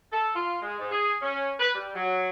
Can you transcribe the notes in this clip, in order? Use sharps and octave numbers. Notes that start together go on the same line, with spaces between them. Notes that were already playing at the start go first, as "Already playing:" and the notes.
A4
F4
G#3
G#2
G#4
C#4
B4
G3
F#3